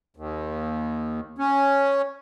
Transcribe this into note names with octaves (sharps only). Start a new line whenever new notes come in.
D#2
C#4